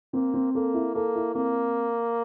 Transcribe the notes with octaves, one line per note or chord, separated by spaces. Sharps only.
A#3 C4
C4
A#3 A4
E4
A#3 A4
E4
A#3 C4